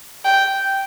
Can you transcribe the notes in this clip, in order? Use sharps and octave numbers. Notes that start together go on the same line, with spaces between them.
G5